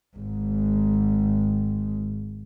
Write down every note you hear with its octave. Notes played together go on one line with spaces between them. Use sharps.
G#1 G#2